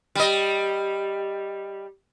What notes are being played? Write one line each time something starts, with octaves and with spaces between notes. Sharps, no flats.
G3 D#5